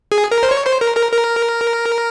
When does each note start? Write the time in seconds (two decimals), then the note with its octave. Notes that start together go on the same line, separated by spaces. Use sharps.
0.12 G#4
0.31 A#4
0.43 C5
0.51 C#5
0.66 C5
0.81 A#4
0.96 A#4
1.12 A#4